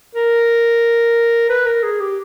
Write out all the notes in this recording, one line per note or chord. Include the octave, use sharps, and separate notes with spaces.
A#4
B4
A#4
G#4
G4